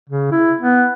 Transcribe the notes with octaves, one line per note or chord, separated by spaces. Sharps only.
C#3
E4
B3